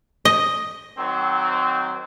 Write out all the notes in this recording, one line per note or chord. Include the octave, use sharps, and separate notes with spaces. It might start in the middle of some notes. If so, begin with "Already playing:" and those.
D#5
D#3 F#3 C4